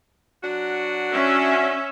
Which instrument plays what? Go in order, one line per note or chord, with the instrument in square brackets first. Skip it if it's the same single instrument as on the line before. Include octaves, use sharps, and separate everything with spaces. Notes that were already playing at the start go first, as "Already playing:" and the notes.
[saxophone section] F#3 D4 F#4
[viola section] C#4 E5